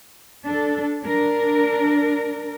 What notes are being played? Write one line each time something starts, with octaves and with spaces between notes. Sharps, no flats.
D4 A4
D4 A#4